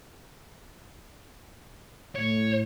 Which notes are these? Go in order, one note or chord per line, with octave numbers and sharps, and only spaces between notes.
A2 C#5